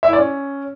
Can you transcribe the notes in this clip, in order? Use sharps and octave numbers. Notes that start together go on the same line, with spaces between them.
E5
E4
D5
C#4